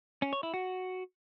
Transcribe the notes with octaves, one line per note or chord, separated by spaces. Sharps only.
C#4
C#5
E4
F#4